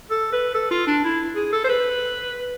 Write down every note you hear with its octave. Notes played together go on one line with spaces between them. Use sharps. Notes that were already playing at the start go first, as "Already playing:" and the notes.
A4
B4
A4
F4
D4
E4
G#4
A4
C5
B4